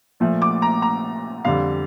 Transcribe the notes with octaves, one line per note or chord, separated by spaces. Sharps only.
A#2 F3 A3
D6
A#5
A#5
F2 D3 G3 F5